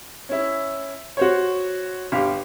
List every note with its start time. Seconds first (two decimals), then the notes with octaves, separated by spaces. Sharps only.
0.29 C#4 E4
1.17 F#4 C5 C#5
2.12 G1 G4 F5